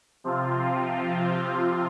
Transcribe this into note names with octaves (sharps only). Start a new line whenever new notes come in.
C3 F3 C4 F4